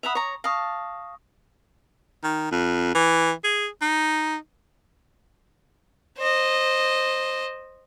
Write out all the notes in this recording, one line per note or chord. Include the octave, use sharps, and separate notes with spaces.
E5 F#5 B5 D#6 F7
C#5 A#5
F5 A5 C#6 D#6 A#6
D#3
F2
E3
G#4
D#4
C5 D#5